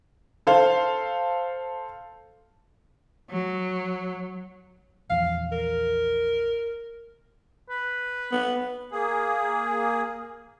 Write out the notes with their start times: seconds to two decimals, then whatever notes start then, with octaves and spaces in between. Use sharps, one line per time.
0.47 A4 C5 F5
3.30 F#3
5.10 A#1 E2 F3 F5
5.52 A#4
7.70 B4
8.32 B3
8.92 A#3 G#4